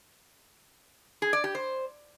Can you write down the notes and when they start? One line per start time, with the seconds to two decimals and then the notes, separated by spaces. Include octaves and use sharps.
1.22 G#4
1.33 D5
1.44 G4
1.55 C5